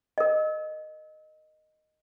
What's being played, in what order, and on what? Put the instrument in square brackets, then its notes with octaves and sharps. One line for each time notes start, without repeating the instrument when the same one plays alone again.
[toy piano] A#4 D#5